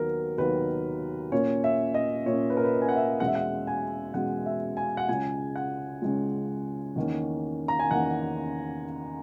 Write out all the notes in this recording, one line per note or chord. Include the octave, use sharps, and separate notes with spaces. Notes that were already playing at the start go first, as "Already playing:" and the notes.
Already playing: D#2 D#3 F#3 B3 A#4
D#2 D#3 F#3 B3 B4
A#2 A#3 C#4 C#5
E5
D#5
A#2 A#3 C#4 C#5
B4
A#4
B4
G#5
F#5
E5
E2 B2 G#3 C#4 F#5
E5
F#5
G#5
E2 B2 G#3 C#4 F#5
E5
G#5
F#5
C#2 C#3 G#3 C#4 G#5
F#5
C#2 C#3 G#3 C#4
E2 D#3 A#3 C#4
A#5
G#5
E2 D#3 A#3 C#4 F#5